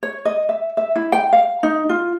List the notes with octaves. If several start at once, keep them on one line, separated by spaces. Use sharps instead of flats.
C#5
D#5
E5
E5
E4
G5
F5
D#4
F4